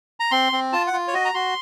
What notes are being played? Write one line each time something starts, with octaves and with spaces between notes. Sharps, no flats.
A#5
C4 C6
C4
F4 A5
F#5
F4
C#5
F#4 D#5
A#5
F#4 C6